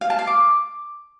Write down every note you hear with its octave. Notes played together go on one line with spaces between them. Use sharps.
F5
A5
F5
D6